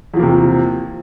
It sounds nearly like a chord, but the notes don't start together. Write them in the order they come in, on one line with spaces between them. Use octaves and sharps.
E2 F3 A#3 C3